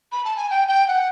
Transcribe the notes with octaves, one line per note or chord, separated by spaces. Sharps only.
B5
A5
G#5
G5
G5
F#5